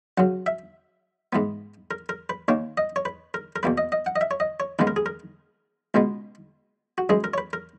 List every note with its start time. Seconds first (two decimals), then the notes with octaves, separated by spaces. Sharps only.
0.18 F#2 C#3 F#3 F#5
0.46 E5
1.33 G#2 E3 B3
1.91 A#4
2.09 A#4
2.29 B4
2.48 D#2 D#3 A#3 C#5
2.77 D#5
2.96 C#5
3.05 B4
3.34 A#4
3.56 A#4
3.63 E2 B2 A#3 B4
3.78 D#5
3.92 D#5
4.06 F#5
4.16 D#5
4.21 E5
4.31 C#5
4.40 D#5
4.60 C#5
4.79 D#2 C#3 E3 G#3 B3 B4
4.87 A#4
4.96 G#4
5.06 A#4
5.94 C#2 B2 G#3 B3
6.98 F#4
7.09 F#2 E3 G#3 G#4
7.24 A#4
7.34 C#5
7.38 B4
7.53 A#4